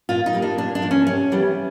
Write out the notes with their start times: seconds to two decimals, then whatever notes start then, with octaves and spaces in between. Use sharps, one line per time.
0.09 A#2 F4
0.26 D#4
0.33 G3 A#3
0.42 D4
0.58 A#2 D4
0.75 D4
0.82 F3 A#3
0.91 C#4
1.07 C3 C#4
1.32 E3 G3 B3